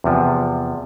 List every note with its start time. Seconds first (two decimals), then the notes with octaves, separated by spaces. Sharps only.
0.04 E2 C3 F3